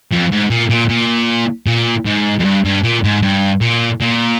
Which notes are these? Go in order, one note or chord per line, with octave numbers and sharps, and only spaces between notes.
F2
G#2
A#2
A#2
A#2
A#2
G#2
F2
G2
G2
A#2
G#2
G2
A#2
A#2